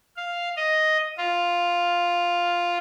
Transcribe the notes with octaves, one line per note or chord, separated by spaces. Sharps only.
F5
D#5
F4